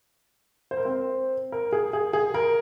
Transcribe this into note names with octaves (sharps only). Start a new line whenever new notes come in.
C5
A#4
C4 C5
A#4
G#4
G#4
G#4
A#4